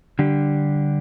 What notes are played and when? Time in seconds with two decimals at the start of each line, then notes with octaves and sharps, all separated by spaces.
0.19 D3 G3 D4 G4